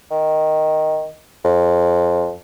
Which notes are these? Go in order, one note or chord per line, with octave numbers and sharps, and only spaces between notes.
D#3
F2